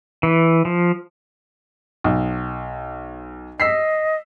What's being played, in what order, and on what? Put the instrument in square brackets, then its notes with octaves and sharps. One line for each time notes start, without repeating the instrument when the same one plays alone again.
[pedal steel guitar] E3
F3
[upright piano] B1
[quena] D#5 [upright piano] E6 B6 C7